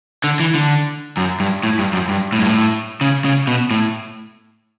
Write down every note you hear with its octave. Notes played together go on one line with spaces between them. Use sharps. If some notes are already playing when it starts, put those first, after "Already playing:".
D3
E3
D3
F#2
G2
A2
G2
F#2
G2
A2
G2
A2
C#3
C#3
B2
A2